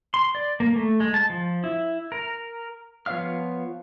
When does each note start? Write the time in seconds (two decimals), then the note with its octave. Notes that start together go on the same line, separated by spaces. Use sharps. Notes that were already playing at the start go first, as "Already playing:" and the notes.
0.14 C6
0.35 D5
0.60 A#3
0.76 A3
1.00 G#3
1.14 A5
1.30 F3
1.64 E4
2.12 A#4
3.06 F3 B3 C#5 F5 F6